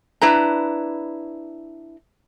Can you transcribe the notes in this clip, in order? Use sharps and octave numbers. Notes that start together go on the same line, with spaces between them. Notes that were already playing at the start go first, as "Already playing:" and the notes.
D4 E4 B4 A#5